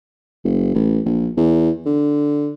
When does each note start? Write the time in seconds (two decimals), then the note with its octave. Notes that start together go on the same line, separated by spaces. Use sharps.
0.44 F#1
0.75 A1
1.06 A#1
1.37 E2
1.86 D3